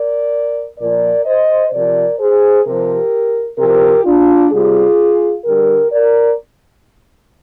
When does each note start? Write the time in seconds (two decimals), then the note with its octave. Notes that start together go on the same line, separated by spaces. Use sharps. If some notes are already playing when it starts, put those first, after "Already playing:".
Already playing: A#4 D5
0.79 A#2 F3 A#4 D5
1.25 C5 D#5
1.72 C3 F3 A#4 D5
2.19 G#4 C5
2.65 C3 F3 G4 A#4
3.58 C3 F3 G4 A#4
4.05 D4 F4
4.51 C3 G3 F4 G#4
5.45 D3 G3 G4 A#4
5.92 A#4 D5